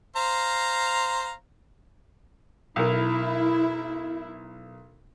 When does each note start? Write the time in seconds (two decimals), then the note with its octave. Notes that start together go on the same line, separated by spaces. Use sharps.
0.16 C5 F5 A#5
2.76 B1 E4 A#4